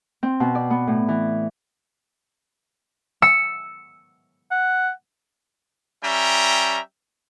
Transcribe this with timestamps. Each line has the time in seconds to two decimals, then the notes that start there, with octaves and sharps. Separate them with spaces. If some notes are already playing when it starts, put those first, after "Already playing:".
0.23 C4
0.40 B2
0.55 D5
0.70 B3
0.87 A2
1.08 E3
3.22 E6 C#7
4.51 F#5
6.04 G3 C#4 E5 G5 A#5